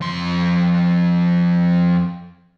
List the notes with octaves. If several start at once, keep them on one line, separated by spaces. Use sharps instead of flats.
F2 C6